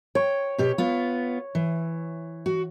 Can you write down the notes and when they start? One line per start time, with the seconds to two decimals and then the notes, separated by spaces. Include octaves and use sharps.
0.15 C#5 G5
0.58 B2 G4
0.78 B3 F4
1.55 E3
2.46 F#4